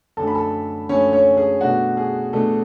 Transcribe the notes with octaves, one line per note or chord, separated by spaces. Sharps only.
F#2 D3 A3 A4 A5
B5
A4 A5
F#2 D3 A3 C#4 C#5
C#4 C#5
G#4
B2 A3 D4 F#4
G#4
B2 A3 D4 A4